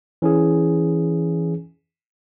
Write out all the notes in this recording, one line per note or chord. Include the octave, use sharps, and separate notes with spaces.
E3 C#4 E4 G#4